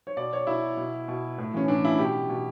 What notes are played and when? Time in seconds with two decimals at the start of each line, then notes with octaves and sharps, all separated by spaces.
0.07 C#5
0.17 B2 D5
0.33 C#5
0.47 B2 E4
0.77 B2
1.08 B2
1.38 A2
1.54 E3 C#4
1.68 A2 D4
1.83 E3 E4
1.99 B2 G4
2.29 B2